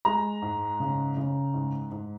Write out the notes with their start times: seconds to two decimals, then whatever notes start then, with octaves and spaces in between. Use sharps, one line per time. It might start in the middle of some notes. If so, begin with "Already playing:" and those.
0.05 G#3 A#5
0.42 G#2
0.80 C#3
1.17 C#3
1.54 G#2
1.91 G#2